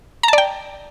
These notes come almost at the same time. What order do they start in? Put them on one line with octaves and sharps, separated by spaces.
A#5 A5 D5 G5